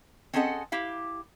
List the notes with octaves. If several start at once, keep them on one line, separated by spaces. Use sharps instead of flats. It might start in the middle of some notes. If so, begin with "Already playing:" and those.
C4 C#4 G#4 A4 D#5 F#5
E4 G4 F5